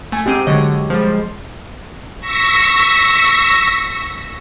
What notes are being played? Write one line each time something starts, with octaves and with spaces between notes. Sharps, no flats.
A3 G#5
G#2 C4 G4 D#7
D3 F#3 G#3 C#5 D#5
F3 G3 G#3 C5
G#3
C#6 E6 A#6 B6